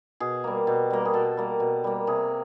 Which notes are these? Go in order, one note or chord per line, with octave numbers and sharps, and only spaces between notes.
B2 G#4
G3 A#3
B2
G3 A#3
G#4
B2 A4
G3 A#3
B2
G3 A#3
C3 G#4